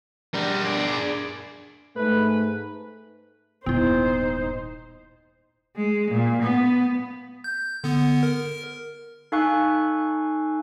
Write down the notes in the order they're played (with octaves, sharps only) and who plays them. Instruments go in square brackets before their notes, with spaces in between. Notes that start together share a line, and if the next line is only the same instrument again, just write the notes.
[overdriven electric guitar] G3 [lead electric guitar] D4 A#4
[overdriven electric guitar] G#4 D5
[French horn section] G#2 A3 [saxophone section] B4
[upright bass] D#1 G#2 [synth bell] B3 E4 [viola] D#4 C5
[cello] G#3
A#2
B3
[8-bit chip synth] G6
D3 B3
A#4
[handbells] D#4 A4 F5 G#5 C#6 F#6